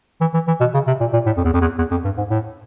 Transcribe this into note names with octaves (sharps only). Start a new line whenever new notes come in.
E3
E3
E3
B2
C#3
C3
A#2
A#2
A2
F2
E2
F2
E2
E2
F2
G2
G#2
A2